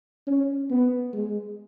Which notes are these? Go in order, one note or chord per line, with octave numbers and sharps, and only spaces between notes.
C#4
B3
G#3